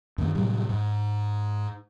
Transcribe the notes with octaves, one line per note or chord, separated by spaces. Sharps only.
F#2 D#3 A#3
A2 C3 F#3 G3
G#2